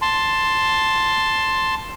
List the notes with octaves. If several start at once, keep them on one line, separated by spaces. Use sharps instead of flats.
A5 C6